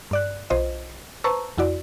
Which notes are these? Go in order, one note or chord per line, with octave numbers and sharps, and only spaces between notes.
G2 D5 F#6
B1 F4 C5 D#5
B4 C5 A5 A#5 C#6 E6
F2 E4 F#4 D5